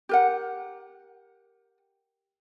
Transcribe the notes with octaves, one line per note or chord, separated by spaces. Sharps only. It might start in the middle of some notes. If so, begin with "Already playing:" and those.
G4 A#4 F#5